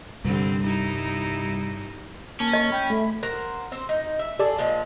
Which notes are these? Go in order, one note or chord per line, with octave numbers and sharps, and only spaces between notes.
C2 G2 D3 G3 C4
G3 D#4 E4
A#3 C#4 A5
D#5
G5 B5
A3
A#4 C5 F#5
C4 C5
D#4
E5
G#4 A4 D5
A#2 F3 G#3